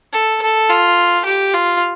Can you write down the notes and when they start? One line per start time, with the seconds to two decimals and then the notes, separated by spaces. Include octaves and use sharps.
0.13 A4
0.41 A4
0.69 F4
1.25 G4
1.54 F4